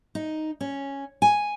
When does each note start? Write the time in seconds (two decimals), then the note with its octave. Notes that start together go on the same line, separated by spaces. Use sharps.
0.15 D#4
0.61 C#4
1.22 G#5